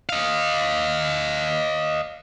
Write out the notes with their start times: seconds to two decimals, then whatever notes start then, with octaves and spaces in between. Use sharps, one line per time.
0.09 D#5 F5